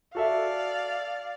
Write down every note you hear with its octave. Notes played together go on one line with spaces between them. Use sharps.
F#4 A4 D5 E5 F5